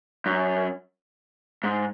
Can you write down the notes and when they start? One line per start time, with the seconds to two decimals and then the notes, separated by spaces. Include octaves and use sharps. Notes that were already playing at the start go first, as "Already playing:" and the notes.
0.26 F#2
1.64 G#2